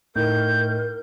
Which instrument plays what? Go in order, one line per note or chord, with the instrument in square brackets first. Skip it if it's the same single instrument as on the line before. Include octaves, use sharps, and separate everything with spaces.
[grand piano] A2 D#4 [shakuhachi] A#4 [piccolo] G6